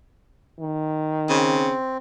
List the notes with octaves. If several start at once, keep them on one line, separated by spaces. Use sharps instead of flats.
D#3
C#3 C4